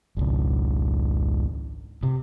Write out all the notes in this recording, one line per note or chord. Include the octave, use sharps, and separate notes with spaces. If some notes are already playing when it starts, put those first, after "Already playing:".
G#1 C#2
C3